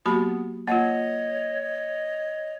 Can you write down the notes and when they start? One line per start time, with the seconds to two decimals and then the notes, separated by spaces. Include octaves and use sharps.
0.06 F#3 A#3 B3 F#4 G4 B5
0.68 A#3 F4 C#5 D#5 F#5
1.63 D#5